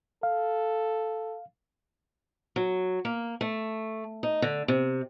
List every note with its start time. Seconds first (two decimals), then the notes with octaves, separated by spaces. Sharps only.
0.23 A4 F5
2.56 F#3
3.05 A#3
3.41 A3
4.23 D#4
4.42 D3
4.68 C3